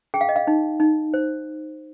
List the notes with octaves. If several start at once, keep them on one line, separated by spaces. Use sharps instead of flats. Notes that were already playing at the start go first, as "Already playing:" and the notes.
G#4 G5
F5
D#5
F5
D#4
D#4
C5